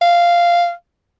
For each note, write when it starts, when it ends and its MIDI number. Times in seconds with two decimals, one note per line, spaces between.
0.02 0.72 77